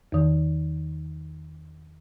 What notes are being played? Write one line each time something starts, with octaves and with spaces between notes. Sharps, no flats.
E2 D#3